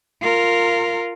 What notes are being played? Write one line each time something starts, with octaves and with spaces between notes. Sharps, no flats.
F4 A#4